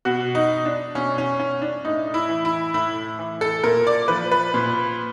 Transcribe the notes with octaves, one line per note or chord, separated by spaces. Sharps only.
B2 F#4
D#4
D4
B2 C#4
C#4
C#4
D4
A2 D#4
E4
E3
E4
A2 E4
E3
A4
A#2 A#4
D5
F3 B4
B4
A#2